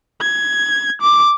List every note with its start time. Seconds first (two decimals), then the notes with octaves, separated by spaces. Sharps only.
0.21 G#6
1.01 D6